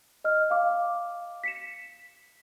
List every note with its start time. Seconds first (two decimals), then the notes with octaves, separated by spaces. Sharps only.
0.24 D#5 F6
0.50 F5 D6
1.44 B6 C#7 E7